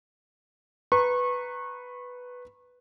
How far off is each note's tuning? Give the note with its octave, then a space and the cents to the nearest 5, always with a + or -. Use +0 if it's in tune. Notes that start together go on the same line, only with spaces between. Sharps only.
B4 +0 A#5 +0 C#6 -30